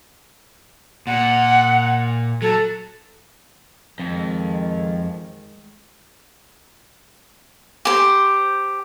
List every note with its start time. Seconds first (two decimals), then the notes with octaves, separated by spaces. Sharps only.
1.07 A#2 F#5
2.42 F#3 A4
3.99 F2 D#3 G#3
7.85 G4 C5